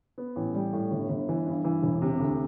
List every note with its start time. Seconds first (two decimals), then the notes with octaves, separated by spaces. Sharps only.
0.18 B3
0.36 A1
0.54 G3
0.73 A2
0.91 G1
1.09 G1
1.29 E3
1.46 G2
1.64 E3
1.83 E1
2.02 C3
2.20 D2